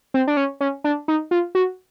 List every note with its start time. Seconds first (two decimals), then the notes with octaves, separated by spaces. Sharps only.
0.14 C4
0.27 D4
0.37 C#4
0.61 C#4
0.84 D4
1.08 D#4
1.31 F4
1.55 F#4